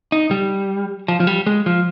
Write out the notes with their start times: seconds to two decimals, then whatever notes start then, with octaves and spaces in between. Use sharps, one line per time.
0.12 D#4
0.31 G3
1.08 F3
1.20 F3
1.27 G3
1.47 G#3
1.66 F3